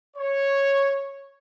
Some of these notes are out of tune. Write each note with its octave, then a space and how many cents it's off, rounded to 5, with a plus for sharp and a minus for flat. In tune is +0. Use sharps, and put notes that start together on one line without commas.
C#5 -5